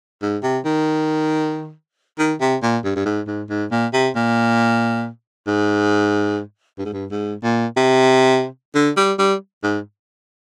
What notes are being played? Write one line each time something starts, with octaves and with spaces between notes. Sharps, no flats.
G#2
C3
D#3
D#3
C3
A#2
G2
G2
G#2
G#2
G#2
A#2
C3
A#2
G#2
G2
G#2
G2
G#2
A#2
C3
D3
G3
G3
G#2